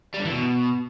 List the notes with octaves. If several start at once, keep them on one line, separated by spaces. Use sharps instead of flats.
G3
D3
E3
B2